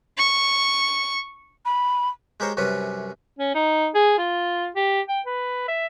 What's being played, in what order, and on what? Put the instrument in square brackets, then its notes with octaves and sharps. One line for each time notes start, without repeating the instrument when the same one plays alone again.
[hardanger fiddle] C#6
[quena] B5
[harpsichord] G#3 G4 A#4 C5 C#5
C2 F#2 C3 C#4 B4
[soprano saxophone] C#4
D#4
G#4
F4
G4
G5
B4
E5